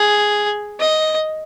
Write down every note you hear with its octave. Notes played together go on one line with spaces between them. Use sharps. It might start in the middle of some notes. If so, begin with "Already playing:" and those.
Already playing: G#4
D#5